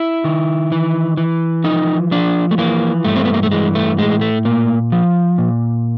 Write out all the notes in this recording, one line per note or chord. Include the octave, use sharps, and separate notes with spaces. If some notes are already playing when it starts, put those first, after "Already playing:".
Already playing: E4
D#3
E3
E3
F3 D#4
F3 D4
A3
E3 A#3
G2 A3
C4
B3
A#3
A3
E3 G#3
A3
A2 G#3
A3
A#2 A#3
F3
A#2